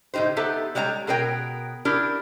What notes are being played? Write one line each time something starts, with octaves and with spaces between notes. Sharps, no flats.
A2 D3 D#4 G4 C5
B3 D#4 G4 A4 E5
G3 G#3 C#5 F#5 A#5
B2 G#4 A#4 C#5 G5
D4 E4 G4 A#4